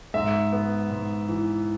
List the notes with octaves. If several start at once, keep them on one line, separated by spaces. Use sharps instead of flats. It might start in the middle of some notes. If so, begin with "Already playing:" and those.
G#2 E5
B3
G#2
E3